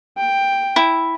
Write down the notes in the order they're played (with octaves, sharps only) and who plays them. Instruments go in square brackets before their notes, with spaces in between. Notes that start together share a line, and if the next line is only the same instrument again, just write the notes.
[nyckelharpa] G5
[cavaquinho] E4